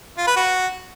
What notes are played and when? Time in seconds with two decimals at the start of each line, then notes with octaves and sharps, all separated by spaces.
0.18 F4
0.27 B4
0.36 F#4